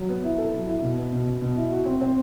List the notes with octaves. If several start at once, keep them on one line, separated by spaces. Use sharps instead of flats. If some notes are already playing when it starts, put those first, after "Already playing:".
Already playing: F#3
B3
E4
A4
F#3
E4
B2
B3
B2
B2
B2
E4
F#4
C4
C4